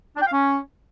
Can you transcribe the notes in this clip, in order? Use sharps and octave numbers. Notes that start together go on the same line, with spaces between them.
D4
G5
F5
C#4